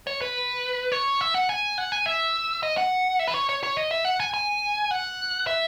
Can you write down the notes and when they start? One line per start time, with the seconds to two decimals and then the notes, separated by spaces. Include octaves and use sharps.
0.07 C#5
0.22 B4
0.92 C#5
1.21 E5
1.34 F#5
1.49 G#5
1.78 F#5
1.92 G#5
2.06 E5
2.63 D#5
2.77 F#5
3.19 E5
3.28 B4
3.34 C#5
3.49 C#5
3.63 C#5
3.77 D#5
3.91 E5
4.05 F#5
4.20 G#5
4.34 G#5
4.91 F#5
5.47 E5